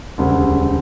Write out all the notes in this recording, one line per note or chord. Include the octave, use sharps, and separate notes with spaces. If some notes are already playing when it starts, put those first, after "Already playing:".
E1 D2 C#3 G3